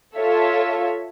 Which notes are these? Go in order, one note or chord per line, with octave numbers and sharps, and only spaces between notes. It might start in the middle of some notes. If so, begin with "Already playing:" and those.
F4 A4 C#5 E5